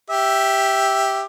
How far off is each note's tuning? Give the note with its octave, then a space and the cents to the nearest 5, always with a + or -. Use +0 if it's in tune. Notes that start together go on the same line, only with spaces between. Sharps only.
G4 +0 E5 +0